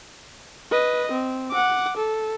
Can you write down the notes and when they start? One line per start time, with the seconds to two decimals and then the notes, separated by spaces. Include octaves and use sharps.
0.71 B4 D#5
1.12 C4
1.51 F#5 D6
1.97 A4